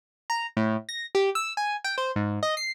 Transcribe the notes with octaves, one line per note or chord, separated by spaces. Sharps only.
A#5
A2
A#6
G4
E6
G#5
G5
C5
G#2
D#5
C7